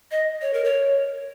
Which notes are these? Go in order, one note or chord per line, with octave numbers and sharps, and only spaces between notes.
D#5
C#5
A#4
C#5